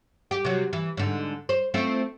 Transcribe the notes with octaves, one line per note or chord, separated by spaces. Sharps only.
G4
C3 F#3
E3
G#2 D3
C5
A3 C4 F4